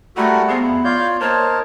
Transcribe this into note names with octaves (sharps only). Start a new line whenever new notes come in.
G3 A3 E4 F#4 A4 A#4 F#5
B3 C4 G#4 F5
F2 E4
F4 C#5 D5 F5 G6
A#3 D#4 A#4 C5 C#5 A5